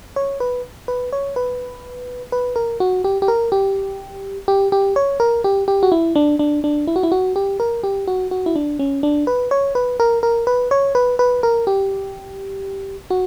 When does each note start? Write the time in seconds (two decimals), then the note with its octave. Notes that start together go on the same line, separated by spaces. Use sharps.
0.16 C#5
0.40 B4
0.88 B4
1.13 C#5
1.36 B4
2.32 B4
2.56 A#4
2.80 F#4
3.04 G4
3.22 G4
3.28 A#4
3.52 G4
4.48 G4
4.72 G4
4.96 C#5
5.20 A#4
5.44 G4
5.68 G4
5.83 F#4
5.92 E4
6.15 D4
6.39 D4
6.64 D4
6.87 E4
6.96 F#4
7.03 E4
7.12 F#4
7.36 G4
7.60 A#4
7.83 G4
8.07 F#4
8.31 F#4
8.46 E4
8.56 D4
8.79 C#4
9.03 D4
9.27 B4
9.51 C#5
9.75 B4
10.00 A#4
10.23 A#4
10.47 B4
10.71 C#5
10.95 B4
11.19 B4
11.43 A#4
11.67 G4
13.10 F#4